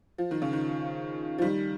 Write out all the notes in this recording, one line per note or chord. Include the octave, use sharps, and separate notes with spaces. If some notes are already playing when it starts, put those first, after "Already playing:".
F3
D#3
C#3
D#3
F3
D#3 G3